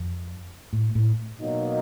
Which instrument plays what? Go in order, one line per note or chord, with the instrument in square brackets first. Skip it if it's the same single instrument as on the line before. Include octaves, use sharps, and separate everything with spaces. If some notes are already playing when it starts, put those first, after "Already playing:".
Already playing: [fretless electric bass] F2
A2
A2
[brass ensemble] B2 F#3 A#3 D#4